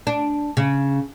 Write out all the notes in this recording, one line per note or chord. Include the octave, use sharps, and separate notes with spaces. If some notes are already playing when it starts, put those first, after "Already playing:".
D4
C#3